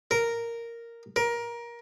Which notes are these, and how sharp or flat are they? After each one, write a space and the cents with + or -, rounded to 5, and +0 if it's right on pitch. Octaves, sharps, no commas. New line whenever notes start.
A#4 -5
A#4 +20